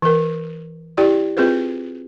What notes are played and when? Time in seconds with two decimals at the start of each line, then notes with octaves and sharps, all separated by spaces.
0.02 E3 A#4
0.97 E4 G4 D5 G5
1.37 C4 F4 G#4 B4 C5